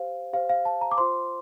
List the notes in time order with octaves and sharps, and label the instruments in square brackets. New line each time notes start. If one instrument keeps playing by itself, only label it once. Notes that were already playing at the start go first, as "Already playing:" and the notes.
Already playing: [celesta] G4 C5 F5
G4 F5
C5
F5
A5
A#5
D6
F4 C5 C6